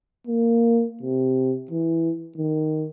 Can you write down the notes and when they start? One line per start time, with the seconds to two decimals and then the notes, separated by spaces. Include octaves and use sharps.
0.27 A#3
1.02 C3
1.71 E3
2.37 D#3